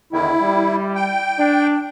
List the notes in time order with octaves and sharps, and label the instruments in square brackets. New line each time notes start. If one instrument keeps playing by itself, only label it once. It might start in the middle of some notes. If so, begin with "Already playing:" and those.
[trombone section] E2 D3 D#3 [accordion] E4
[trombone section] G3
[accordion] G5
[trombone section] D4